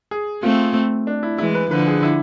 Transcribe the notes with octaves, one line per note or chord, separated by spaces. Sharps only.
G#4
A3 C4 F4
D4
E4
E3 G#3 E4
B4
D3 F3 B4
G#4
E4